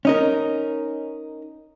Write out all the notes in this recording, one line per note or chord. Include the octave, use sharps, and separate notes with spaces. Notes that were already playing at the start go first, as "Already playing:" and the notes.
C#4 D#4 A#4